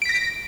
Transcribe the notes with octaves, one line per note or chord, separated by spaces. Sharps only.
A#6 B6 D7